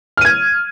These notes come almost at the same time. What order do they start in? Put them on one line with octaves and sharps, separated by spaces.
F6 D#7 G#6